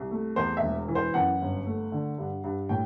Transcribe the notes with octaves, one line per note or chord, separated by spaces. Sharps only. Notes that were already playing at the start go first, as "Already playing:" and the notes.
Already playing: C2
A3
E2 C5
E5
E1
E3
C5
F#2 F#5
G1
A3
D3
G2
G2
A2 G5